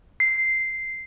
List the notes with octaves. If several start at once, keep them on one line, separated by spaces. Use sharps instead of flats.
C7